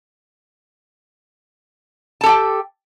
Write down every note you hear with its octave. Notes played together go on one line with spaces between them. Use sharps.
G4 A4 G5 A5